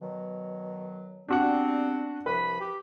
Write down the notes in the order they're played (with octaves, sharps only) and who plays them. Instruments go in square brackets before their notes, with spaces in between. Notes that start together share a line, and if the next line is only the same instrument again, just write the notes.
[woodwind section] B2 D#3 F#3
[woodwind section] G3 B3 C4 [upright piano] D4 F#4 F#5
[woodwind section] C2 F3 B5 [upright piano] B4
[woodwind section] G4